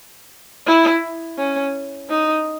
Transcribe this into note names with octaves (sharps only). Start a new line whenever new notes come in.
E4
C#4
D#4